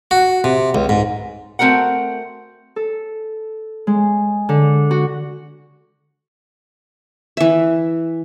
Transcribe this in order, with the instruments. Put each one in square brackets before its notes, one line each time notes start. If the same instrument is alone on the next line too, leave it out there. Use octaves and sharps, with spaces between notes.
[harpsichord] F#4
C3
C#2
G#2
[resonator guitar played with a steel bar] A3 C4 F#4 A#4 F#5
[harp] A4
G#3
D3
F#4
[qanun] E3 E5